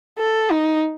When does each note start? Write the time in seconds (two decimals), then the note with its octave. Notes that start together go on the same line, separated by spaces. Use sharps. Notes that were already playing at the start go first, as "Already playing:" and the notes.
0.18 A4
0.51 D#4